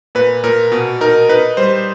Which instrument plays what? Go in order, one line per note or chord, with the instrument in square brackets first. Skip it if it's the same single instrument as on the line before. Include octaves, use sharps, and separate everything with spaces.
[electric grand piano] A#2 B4
A#2 A#4
B2
D#4 A#4
D#4 B4
G3 C5